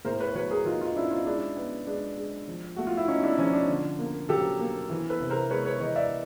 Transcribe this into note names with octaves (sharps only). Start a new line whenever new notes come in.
A2 A#4 C5
B4 C#5
F#3 B4 C#5
G#4 A#4
F#3 D#4 F4
D#4 F4
C#4 D4 E4
D#4 F4
G#3 D4 E4
B3
G#3 D4
G#3
F3
A3 F#4
F4
E4
C#4 D#4
D4 E4
F3 C#4 D#4
D4
D3
A#3
F#3 G4 A4
A#3
E3
A4 B4
C3
A#4 C5
G#3 B4 C#5
B4 C#5
E3 C#5 D#5
D5 E5